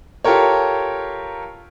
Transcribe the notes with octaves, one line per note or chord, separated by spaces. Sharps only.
F4 G4 A4 A#4 C#5